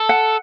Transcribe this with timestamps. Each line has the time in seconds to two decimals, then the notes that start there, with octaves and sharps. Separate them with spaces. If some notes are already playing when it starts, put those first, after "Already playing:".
Already playing: A4
0.09 F#5